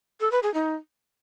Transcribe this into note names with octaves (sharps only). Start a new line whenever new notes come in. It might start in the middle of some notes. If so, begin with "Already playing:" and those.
A4
B4
G#4
D#4